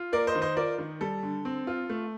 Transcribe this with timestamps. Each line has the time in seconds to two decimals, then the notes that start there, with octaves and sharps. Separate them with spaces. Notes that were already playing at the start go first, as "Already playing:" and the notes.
Already playing: F4
0.12 A#3 A#4 D5
0.27 C5 D#5
0.35 D#3
0.42 C5 D#5
0.57 F4 A#4 D5
0.78 D#3
1.01 G3 A4
1.23 D3
1.45 C4
1.67 F4
1.90 A3